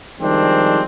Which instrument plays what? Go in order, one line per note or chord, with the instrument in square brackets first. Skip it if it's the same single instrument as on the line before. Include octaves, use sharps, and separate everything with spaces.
[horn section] D#3 F3 G3 G#3 C4 D4